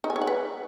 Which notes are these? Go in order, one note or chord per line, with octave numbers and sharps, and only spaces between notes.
D#4
G#5
C#5
F#5
B4